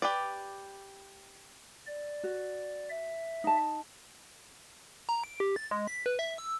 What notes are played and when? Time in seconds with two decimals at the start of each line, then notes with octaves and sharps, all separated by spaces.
0.02 G4 B4 D5
1.87 D5
2.24 F#4
2.90 E5
3.44 D#4 A5
5.09 A#5
5.24 D7
5.40 G4
5.56 A6
5.71 G#3
5.87 B6
6.06 B4
6.19 E5
6.38 E6